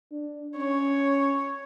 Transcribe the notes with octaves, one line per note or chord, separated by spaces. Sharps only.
D4
C#4 C#5